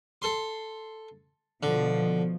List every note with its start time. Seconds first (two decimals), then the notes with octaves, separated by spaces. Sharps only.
0.22 A4 C6
1.63 B2 D3 F3